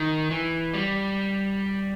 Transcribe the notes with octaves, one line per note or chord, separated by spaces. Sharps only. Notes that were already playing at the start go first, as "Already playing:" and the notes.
Already playing: D#3
E3
G3